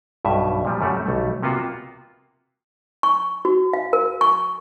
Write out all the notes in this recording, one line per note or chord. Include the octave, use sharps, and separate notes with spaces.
B1 G2 B2 E5
A#2 F3 G3
F#2 G3 A3 F#4
B1 G3 A3
C3 A#3 B3 F4 F#4
C#6
F#4
F5
A#4
C#6